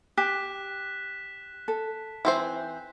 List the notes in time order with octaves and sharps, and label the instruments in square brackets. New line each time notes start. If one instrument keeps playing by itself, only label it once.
[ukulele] G4 [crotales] F#6 B6 E7
[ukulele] A4
[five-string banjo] E3 C4 C5